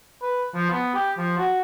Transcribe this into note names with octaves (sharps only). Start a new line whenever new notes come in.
B4
F3
B3
G4
F3
F#4